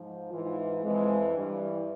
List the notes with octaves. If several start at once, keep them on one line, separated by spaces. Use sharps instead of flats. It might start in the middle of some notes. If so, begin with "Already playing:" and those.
Already playing: G#2 F3
G#2 E3 F4
F2 E3 G#3
G2 E3 G3